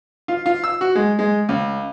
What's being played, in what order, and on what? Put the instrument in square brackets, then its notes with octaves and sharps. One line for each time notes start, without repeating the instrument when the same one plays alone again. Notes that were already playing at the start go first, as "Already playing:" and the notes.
[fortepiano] F4
F4
E6
F#4
G#3
G#3
C#2